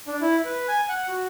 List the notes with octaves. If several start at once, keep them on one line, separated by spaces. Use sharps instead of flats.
D4
E4
B4
G#5
F#5
F#4